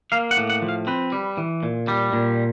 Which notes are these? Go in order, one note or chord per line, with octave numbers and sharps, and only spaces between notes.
A#3 F5
F#5
A2
F#5
F3
F5
C4 B4
G3
E3
A#2
G3
A#2